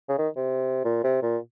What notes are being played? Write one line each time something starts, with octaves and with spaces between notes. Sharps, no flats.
C#3
D#3
C3
A#2
C3
A#2